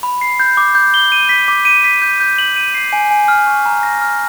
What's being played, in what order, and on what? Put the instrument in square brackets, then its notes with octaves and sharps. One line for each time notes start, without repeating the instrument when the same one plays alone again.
[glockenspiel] B5
C7
G6
D6
G6
G7
D#7
B6
D6
D#7
B6
G6
G6
F#7
D#7
C7
G#5
G#5
F6
C#6
A#5
A#6
F6